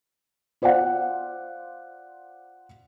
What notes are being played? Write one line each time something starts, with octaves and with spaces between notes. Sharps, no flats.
F4 C5 D5 F5 F#5